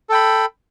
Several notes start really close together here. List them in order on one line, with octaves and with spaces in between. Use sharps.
A4 G5 B5